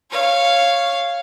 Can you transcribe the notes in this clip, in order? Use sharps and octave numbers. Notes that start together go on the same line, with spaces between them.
C#5 F5